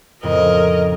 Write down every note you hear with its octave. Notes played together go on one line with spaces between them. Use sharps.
F2 A2 C#3 A#4 D#5